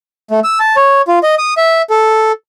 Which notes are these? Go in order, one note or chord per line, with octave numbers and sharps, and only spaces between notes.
A3
E6
A5
C#5
F4
D#5
D#6
E5
A4